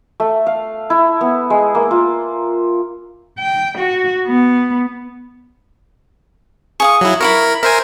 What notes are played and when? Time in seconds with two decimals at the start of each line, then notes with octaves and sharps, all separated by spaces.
0.20 A3
0.47 F5
0.90 E4
1.21 B3
1.50 G#3
1.75 A#3
1.91 F4
3.39 G5
3.78 F#4
4.27 B3
6.80 G#4 F5 C#6 D#6
7.01 F#3 E4
7.21 E4 A#4 C5 B5 C#6
7.63 A#4 C5 E5 G#5